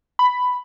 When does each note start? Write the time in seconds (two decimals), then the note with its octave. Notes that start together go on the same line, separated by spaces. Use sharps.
0.19 B5